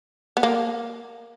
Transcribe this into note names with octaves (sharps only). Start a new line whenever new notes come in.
B3
A#3